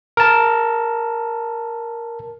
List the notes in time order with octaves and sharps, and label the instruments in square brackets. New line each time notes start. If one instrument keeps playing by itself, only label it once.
[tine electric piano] A#4 A5